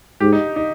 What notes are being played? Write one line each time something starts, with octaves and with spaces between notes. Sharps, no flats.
G#2 G4
D#4
D#4